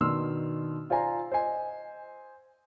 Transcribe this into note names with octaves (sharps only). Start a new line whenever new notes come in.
B2 D#3 D4 C6 E6 F6
F4 C5 D5 G#5 A#5
C5 D#5 G#5